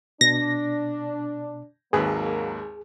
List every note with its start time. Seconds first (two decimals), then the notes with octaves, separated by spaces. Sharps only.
0.21 B2 D4 A#6
1.93 G#1 D#2 F#3 A#3 G#4 B4